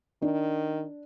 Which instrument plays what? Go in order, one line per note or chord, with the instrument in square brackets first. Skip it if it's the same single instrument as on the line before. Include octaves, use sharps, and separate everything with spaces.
[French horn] D#3 [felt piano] D4